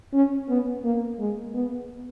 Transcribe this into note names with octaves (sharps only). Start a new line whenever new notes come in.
C#4
B3
A#3
G#3
B3